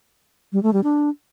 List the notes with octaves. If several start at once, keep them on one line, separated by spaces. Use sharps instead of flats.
G3
A3
G3
D4